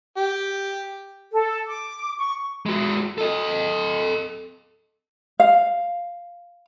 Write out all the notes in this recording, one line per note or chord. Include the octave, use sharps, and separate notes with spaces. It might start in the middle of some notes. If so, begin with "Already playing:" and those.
G4
A4
D6
C#6
G#3 F#4
A4 D#5
F5